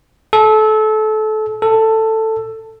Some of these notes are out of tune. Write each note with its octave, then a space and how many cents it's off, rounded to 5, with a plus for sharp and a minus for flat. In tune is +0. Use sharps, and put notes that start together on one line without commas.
A4 -25
A4 +10